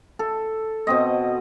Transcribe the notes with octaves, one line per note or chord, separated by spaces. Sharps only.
A4
B2 C4 D#5